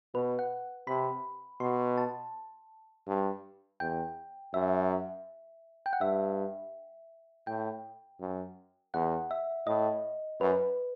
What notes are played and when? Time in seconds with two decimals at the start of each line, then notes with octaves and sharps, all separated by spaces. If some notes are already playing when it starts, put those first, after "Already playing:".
0.14 B2 B4
0.39 F#5
0.87 C3 B5
1.60 B2 C6
1.97 A5
3.07 G2
3.80 E2 G5
4.54 F#2 E5
5.86 G5
5.93 F#5
6.01 G2 E5
7.47 A2 G5
8.21 F#2
8.94 E2 F#5
9.31 E5
9.67 A2 D#5
10.41 F#2 B4